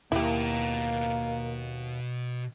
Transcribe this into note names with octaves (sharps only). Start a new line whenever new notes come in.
D#2 B2 A#3 E4 G4 A5